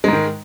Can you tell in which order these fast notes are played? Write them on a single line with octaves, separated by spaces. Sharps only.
G#3 G#2 D#3